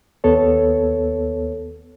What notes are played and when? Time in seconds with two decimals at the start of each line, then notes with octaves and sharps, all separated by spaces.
0.24 D#2 B3 A4 C#5